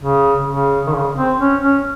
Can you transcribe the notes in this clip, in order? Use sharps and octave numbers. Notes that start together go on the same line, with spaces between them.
C#3
C#3
D#3
C#3
C4
C#4
C#4